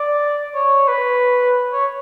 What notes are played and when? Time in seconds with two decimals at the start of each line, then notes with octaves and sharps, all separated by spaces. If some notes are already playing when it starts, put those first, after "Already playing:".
Already playing: D5
0.55 C#5
0.88 B4
1.73 C#5